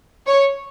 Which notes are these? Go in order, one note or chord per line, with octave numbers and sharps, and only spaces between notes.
C#5